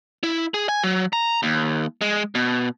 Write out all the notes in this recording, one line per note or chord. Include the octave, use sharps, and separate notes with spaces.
E4
G#4
G#5
F#3
A#5
D#2
G#3
B2